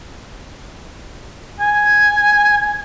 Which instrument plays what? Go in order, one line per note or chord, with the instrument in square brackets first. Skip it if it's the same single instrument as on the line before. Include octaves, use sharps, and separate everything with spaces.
[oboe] G#5